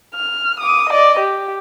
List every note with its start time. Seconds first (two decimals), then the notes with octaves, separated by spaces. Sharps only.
0.14 F6
0.60 D6 D#6
0.90 D5 D#5
1.19 G4